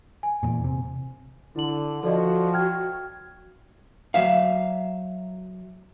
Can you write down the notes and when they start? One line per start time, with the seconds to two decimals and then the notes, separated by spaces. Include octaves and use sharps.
0.23 G#5
0.43 E2 A#2
0.64 C3
1.56 D3 E4 F#7
2.03 F3 F#4 A4 D5 D#5
2.53 G5 F6 G#6
4.14 F#3 E5 F5